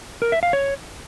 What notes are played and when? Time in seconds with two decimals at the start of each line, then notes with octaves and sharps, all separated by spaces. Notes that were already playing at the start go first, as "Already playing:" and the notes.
0.22 A#4
0.32 E5
0.43 F5
0.53 C#5